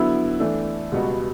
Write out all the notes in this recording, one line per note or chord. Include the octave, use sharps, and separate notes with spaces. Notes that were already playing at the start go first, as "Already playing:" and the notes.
Already playing: D3 F#3 B3 E4
E3 A3 D4
C#2 B2 G3 B3 F#4